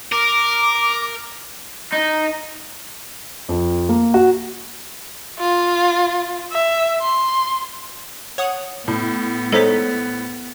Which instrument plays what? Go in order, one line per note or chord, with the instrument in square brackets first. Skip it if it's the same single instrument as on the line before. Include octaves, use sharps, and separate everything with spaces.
[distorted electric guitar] A#4 [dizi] D6
[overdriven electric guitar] D#4
[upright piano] F2
A#3
F#4
[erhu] F4
E5
C6
[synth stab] C#5 F#5 D#6
[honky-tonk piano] A2 [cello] B3
[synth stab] G#3 D#4 C#5 [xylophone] A4 C5 B6